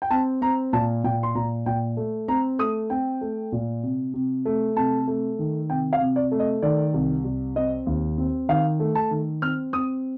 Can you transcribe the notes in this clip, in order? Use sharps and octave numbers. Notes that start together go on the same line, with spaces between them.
G5
C4 A5
C4 A#5
A#2 A5
A#2 G5
C6
A#2 A#5
A#2 G5
A3
C4 A#5
A3 D#6
C4 G5
A3
A#2
C3
C3
A3
C3 A5
A3
D#3
C3 G5
F5
C3
D5
A3
D#5
D#3 D5
C2
C2
C4 D#5
D#2
C4
D#3 F5
A3
A5
D#3
C4 F6
C4 D#6